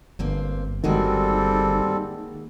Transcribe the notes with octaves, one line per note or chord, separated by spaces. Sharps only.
G1 G2 A#3 C4
D#3 G3 G#3 A#3 C4 F#4 A4